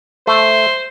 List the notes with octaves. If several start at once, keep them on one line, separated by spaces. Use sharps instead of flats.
A3 C5